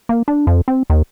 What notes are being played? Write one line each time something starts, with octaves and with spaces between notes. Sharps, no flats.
A#3
D4
F2
C4
D#2